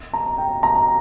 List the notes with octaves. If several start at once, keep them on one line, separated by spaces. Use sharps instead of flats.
A#5
G5
A#5